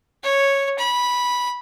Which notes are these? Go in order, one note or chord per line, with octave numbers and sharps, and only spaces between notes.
C#5
B5